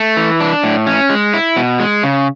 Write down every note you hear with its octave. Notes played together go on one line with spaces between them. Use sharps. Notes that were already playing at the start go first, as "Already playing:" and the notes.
Already playing: A3
E3
D4
A2
C#4
G#3
E4
B2
G#3
C#3